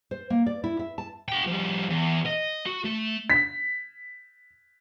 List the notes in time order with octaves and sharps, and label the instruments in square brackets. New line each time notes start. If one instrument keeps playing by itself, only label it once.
[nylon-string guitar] C5
A#3
D5
E4
E5
A5
[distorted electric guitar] F#4 G5
F3 G3
E2
D#5
F#4
A3
[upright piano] B6